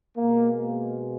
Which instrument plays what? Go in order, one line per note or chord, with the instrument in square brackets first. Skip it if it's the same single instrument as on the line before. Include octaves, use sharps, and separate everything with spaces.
[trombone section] B2 G#3 A#3